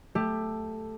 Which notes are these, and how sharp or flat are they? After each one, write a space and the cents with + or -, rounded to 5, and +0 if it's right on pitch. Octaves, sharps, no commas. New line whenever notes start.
A3 +0 G4 +15